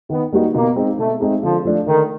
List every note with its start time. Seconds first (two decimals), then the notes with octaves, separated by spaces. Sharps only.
0.10 D#3 B3
0.32 G3 A#3 D#4 F#4
0.55 B2 A#3
0.76 G#3 C4 D#4 G#4
0.98 B2 A3
1.20 G#3 C4 D#4 G#4
1.43 D3 F3
1.65 F3 A3 D4
1.86 D3 D#3